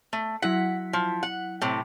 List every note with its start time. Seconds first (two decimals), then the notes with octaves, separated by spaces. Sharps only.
0.13 A3
0.42 F#3 E4 F#5 B6
0.93 F3
1.23 F#5
1.61 A2 C3